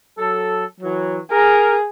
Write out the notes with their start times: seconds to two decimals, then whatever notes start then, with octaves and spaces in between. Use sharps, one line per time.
0.18 F#3 A4
0.80 E3 F#3
1.32 G#4 A#4